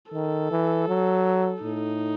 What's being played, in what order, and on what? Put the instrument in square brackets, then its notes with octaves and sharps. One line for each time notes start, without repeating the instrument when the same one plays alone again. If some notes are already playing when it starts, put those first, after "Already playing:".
[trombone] D#3 [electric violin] A4
[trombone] E3
F#3
[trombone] A2 [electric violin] D#4